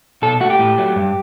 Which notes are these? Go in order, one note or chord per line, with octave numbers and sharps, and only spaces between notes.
B2 A4
A3 F#4
G4
A2
F#3 A3
G2